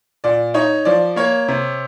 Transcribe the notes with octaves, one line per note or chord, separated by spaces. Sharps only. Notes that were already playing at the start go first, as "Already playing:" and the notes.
A#2 D5
D#4 C#5
F3 D5
A#3 C#5
C3